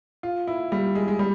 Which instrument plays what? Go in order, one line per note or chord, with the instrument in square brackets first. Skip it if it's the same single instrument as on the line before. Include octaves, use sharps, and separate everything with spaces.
[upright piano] F4
E4
G3
G#3
G#3
G3